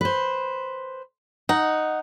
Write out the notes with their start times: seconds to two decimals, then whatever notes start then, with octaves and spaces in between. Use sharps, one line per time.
0.01 B4 C5
1.49 D#4 F#5